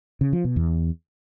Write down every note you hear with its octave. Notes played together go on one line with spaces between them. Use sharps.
C#3
F3
B2
E2